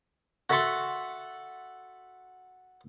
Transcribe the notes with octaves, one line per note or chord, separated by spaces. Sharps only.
F#4 A4 E5 F#5 A5 C6